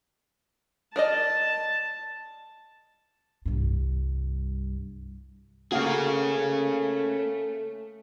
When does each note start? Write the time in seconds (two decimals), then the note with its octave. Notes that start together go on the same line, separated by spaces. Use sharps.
0.96 A#4 D5 D#5 A5
3.46 C2 G2
5.72 A3 A#3 C#4 F#4 G#4 F5